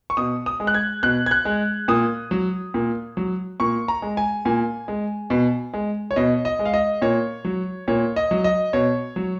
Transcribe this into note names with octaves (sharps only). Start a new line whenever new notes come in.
C#6
B2 D#6
D#6
G#3
F#6
G#6
B2 F#6
G#6
F#6
G#3
A#2 D#6
F#3
A#2
F#3
A#2 C#6
A#5
G#3
G#5
A#2 G#5
G#3
B2
G#3
C#5
B2 D#5
D#5
G#3
F5
D#5
A#2 C#5
F#3
A#2 C#5
D#5
F#3
D#5
B2 C#5
F#3